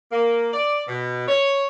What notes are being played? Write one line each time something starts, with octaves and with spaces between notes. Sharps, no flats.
A#3
D5
B2
C#5